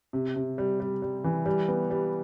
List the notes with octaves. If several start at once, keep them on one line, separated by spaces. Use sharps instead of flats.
C3
C3
G3
G3
G3
E3
G3
B3
G3